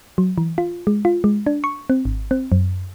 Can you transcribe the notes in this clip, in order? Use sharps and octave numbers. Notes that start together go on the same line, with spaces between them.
F#3
E3
F4
G#3
F4
G#3
D4
C#6
C4
G#1
C4
F#2